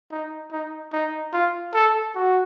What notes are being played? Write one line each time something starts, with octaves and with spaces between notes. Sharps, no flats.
D#4
D#4
D#4
F4
A4
F#4